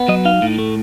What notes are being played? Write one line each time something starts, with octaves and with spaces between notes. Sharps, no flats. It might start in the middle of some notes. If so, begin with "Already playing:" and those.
Already playing: B3
F#3 D#5
D#4 F5
A2
A3